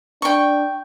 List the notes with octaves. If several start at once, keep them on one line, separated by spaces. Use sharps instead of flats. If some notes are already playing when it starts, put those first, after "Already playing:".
D4 G5 C#6